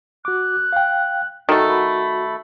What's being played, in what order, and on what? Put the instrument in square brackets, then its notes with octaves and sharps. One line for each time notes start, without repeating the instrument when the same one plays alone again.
[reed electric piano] F#4 D6 [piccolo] F#6
[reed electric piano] F5 G5
[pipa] D#3 A3 [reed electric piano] F#4 A4 A#4
[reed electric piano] F#4 [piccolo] B5